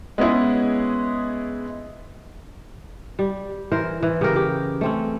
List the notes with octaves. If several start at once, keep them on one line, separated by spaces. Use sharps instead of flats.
G#3 B3 C#4 E4 G#4
G3
E3 A#4 C5
E3
C#3 G4 A#4
G4
A3 C4 C#4